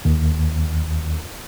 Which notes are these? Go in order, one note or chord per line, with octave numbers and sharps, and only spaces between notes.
D#2